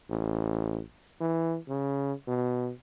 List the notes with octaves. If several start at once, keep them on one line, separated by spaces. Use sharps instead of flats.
A1
E3
C#3
B2